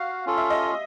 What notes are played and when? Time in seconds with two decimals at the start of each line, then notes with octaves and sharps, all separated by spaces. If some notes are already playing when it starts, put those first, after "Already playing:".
Already playing: F#4 F5
0.26 C#4 F4 A4
0.38 E5
0.50 D#5